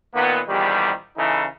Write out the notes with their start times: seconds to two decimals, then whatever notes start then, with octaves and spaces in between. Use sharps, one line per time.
0.14 A#2 D#3 A#3 B3
0.48 A#1 E2 D#3 G3
1.17 C#3 E3 D#4 E4 A4